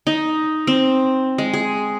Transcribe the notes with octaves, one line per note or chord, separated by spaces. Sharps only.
D#4
C4
G#3
G#4